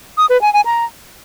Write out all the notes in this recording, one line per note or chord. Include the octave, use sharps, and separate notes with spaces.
D#6
B4
G#5
G#5
A#5